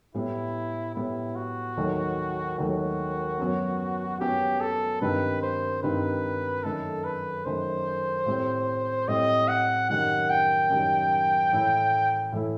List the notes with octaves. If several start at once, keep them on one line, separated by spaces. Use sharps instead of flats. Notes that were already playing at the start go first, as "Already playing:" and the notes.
A2 G3 B3 E4
A2 G3 B3 E4
F#4
D#2 D#3 F#3 A3
D#2 D#3 F#3 A3 F#4
F#2 F#3 B3
F#2 F#3 B3 G4
A4
G2 D#3 G3 C4 D#4 B4
C5
G2 D#3 G3 C4 D#4 B4
F#2 D#3 A3 A4
B4
F#2 D#3 A3 C5
A2 G3 C4
A2 G3 C4 D#5
F#5
F#2 D#3 G3 F#5
G5
F#2 D#3 G3
A2 E3 A3 E4
A2 E3 A3 E4